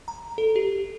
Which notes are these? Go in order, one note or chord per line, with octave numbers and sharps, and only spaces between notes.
A#5
A4
G4